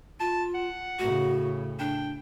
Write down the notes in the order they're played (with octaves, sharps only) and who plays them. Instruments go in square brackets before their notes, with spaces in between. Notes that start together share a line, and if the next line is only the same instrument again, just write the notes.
[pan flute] F4 [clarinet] A5
[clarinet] F#5
[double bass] A2 C#3 [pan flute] F#4
[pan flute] D4 [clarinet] G5